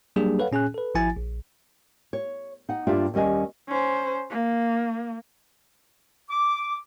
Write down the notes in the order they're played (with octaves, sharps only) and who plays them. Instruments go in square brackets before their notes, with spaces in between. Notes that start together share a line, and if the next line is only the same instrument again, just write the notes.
[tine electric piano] F#3 G3 A#3 D4 G4 G#4
A4 B4 C#5 F5 F#5
A#2 C#4 G#4 G#5 F#6
A4 B4
G#1 F3 E4 G#5 A6
A#1
[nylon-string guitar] C#5
D#4 F#5
G2 A#3 D4 F4 G4 E5
D#2 G3 C#4 D#5 G#5
[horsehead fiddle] C#4 C5
A#3
[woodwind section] D6